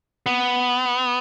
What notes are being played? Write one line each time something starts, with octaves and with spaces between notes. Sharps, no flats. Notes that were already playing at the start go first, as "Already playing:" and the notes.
B3